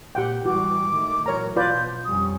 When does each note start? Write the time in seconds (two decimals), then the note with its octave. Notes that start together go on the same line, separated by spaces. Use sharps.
0.15 A#2 G4 F#5 G5
0.46 A1 E3 G3 F#4 D6
0.91 D#3 A3
1.26 A#2 E3 F#3 A#4 C#5 A#5
1.56 B2 F4 B4 D5 G6
2.05 F2 G3 C#4 D#6